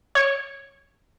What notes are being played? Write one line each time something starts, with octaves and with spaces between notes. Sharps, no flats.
C#5 C#7